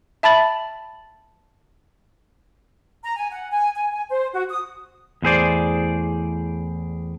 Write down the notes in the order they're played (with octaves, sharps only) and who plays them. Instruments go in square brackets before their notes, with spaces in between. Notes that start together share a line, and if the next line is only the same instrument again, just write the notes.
[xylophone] E5 A5 B5 A6 F#7
[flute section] A#5
G#5
F#5
G#5
G#5
G#5
C5
F#4
D#6
[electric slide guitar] E2 A2 G#4 C5 D5